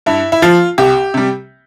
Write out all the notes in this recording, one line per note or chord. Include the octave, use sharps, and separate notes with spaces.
G2 E4
E4
F3 F4
C2 G4
C3 G3